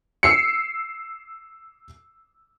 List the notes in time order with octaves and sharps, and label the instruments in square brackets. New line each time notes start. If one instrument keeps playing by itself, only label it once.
[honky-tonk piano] E6 C7 C#7